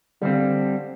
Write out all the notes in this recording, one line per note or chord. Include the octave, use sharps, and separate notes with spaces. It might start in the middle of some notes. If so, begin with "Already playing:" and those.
D3 G3 C4 F5